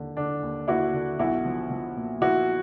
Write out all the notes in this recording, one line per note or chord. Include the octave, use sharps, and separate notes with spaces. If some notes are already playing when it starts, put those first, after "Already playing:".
Already playing: D#2 D3
D3 D4
D#2
D#2 E4 F#4
D3
B1 E4 F#4
F3
F3
A#2
F3 E4 F#4